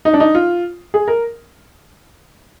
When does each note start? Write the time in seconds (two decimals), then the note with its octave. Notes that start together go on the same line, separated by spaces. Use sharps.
0.05 D#4
0.13 D4
0.20 D#4
0.35 F4
0.94 G#4
1.08 A#4